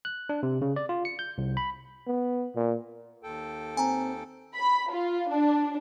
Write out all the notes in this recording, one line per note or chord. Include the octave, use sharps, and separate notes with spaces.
F#6
D4
C3
C#3
D5
F4
C#7
G6
C2
B5
B3
A#2
D#2 A4 G5
C4 G#5 A#5
B5
F4
D4